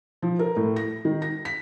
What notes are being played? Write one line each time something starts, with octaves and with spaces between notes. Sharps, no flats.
F3
A#4
A2
A#6
D#3
A#6
B6